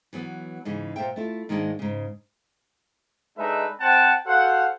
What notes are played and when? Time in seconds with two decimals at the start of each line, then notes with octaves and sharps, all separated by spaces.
0.13 E3 F#3 B3
0.65 G#2 C#3 E3
0.96 A#2 C5 E5 G5
1.16 A3 E4 F4
1.49 G#2 D#3 G#3 A#3 D4
1.79 G#2 C#3
3.38 G#3 D4 D#4 A4 B4 E5
3.80 C4 C5 F#5 G5 A5
4.26 F#4 A4 C5 F5 F#5